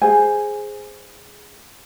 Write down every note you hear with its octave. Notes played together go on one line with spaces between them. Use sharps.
G#4 C5 G#5